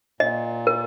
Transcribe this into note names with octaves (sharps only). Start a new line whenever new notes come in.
A#2 D#5
A#4